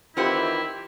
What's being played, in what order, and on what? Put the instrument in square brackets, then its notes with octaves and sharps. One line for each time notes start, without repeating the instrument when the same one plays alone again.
[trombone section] D#3 E3 [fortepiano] C4 G4 [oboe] E4 [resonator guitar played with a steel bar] F4 F#5